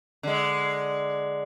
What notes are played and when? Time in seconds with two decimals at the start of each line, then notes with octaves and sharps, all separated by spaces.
0.23 D3 G#3